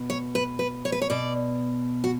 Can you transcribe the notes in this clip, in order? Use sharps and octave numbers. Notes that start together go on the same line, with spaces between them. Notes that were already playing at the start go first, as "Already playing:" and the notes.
Already playing: B2
C#5
B4
B4
C#5
B4
C#5
B2 D5
F#4